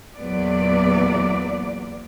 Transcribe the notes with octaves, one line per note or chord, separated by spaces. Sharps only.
E2 A#2 F#3 B3 D5